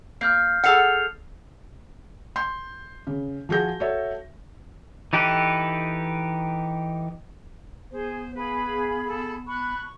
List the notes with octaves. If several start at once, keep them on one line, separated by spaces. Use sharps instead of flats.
A#3 F6 G6 C7
G#4 A4 F#5 F6 C7 F7
C6 G6
C#3
F3 F#4 G#4 G6 A#6
F#4 A4 C#5 E5
E3 D#4 G4 A4 B4
B3 G#4 C5
G#4 B4 F5 B5
A4
A5 B5 C#6 F#6